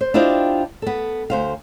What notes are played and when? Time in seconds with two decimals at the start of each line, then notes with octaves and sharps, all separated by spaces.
0.01 C5
0.14 D4 E4 F4 G4 C5 D#5
0.82 B3 A4
1.30 D2 C5 F5